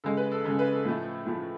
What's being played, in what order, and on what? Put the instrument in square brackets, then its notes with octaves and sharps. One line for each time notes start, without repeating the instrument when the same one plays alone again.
[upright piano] C#3 G#3 A4
B4
A4
C#3 G#3 A4
B4
A4
A2 F3 A3
A2 F3 A3